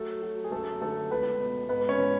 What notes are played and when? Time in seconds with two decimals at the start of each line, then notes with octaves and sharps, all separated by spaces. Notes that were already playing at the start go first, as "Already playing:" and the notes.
Already playing: F#3 A3 A4
0.22 F#3
0.44 G#4
0.52 F#2 A3 A4
0.81 D3 A3 A4
1.11 C#2 B3 B4
1.40 B2
1.69 G#2 B3 B4
1.89 C#4 C#5
1.98 E3